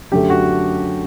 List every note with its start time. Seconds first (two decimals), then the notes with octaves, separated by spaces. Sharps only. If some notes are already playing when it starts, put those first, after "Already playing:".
0.12 F#2 D3 A3 G4
0.30 F#4